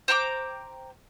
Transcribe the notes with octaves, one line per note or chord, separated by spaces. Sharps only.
C5 G5 A#5 D6